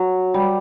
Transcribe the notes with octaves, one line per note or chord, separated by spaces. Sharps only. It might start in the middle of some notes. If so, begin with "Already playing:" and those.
Already playing: F#3
G3